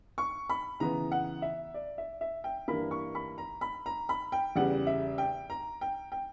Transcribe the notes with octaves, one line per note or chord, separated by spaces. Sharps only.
C#6
B5
C#3 E3 B3 A#5
F#5
E5
D5
E5
E5
G5
G2 E3 A#3 B5
C#6
B5
A#5
B5
A#5
B5
G5
E2 C#3 G3 F#5
E5
G5
A#5
G5
G5